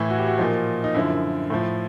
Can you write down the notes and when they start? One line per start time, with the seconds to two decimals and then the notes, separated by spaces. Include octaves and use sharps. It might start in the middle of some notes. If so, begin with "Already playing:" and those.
Already playing: A2 E3 E4
0.10 F#4
0.18 G4
0.27 F#4
0.38 A#2 F3 D#4
0.84 D#4
0.95 F#2 D3 F3 E4
1.50 A2 F3